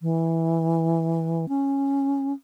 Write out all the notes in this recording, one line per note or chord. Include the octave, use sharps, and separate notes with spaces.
E3
C#4